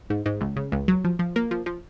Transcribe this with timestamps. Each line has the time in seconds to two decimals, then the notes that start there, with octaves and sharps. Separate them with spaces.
0.10 G#2
0.26 G#2
0.41 C#2
0.56 C#3
0.72 C#2
0.88 F#3
1.04 F3
1.19 F3
1.36 A#3
1.51 F3
1.66 F3